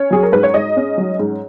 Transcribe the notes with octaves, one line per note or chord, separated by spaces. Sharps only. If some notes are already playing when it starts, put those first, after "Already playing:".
Already playing: C#4 C#5
F#3 G#4
A#4
G#2 B4
C#5
G#2 D#5
C#4
F#3
G#2